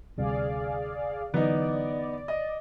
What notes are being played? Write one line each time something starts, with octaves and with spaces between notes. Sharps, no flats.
D2 C3 G3 G#4 D5 F5
D3 E3 F#3 B3 D#4 D5
D#5